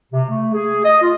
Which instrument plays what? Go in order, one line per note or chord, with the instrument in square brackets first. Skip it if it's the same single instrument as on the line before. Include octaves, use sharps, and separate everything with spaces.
[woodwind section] C3
A3
G#4
D#5
F4